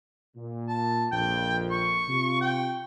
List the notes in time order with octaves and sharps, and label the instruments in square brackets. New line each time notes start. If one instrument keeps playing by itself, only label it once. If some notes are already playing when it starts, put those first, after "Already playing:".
[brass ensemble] A#2
[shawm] A5
[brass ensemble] A#1 F2 [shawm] G5
[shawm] C#6
[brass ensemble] C3 F4
[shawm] G5